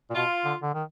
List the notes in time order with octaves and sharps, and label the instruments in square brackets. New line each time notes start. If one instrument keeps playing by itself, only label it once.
[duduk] A#2
[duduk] B2 [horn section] F4
[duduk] D3
D3
D#3